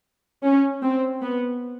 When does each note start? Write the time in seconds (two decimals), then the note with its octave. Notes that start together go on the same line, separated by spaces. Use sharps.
0.44 C#4
0.83 C4
1.22 B3